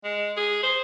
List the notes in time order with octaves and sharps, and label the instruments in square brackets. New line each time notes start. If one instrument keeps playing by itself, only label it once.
[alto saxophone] G#3
G#4
C5